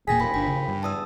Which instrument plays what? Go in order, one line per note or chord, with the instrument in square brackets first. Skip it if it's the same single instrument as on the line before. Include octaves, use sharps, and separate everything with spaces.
[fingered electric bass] E1 A#2 A#3 [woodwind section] G#4 [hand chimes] G5 A#6 B6
[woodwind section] D#2 F3 B5 [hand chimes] G#5
[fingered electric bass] G1 D4 [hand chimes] G5
[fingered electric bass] C#3
G2
[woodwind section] E2 [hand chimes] A5 D#6 E6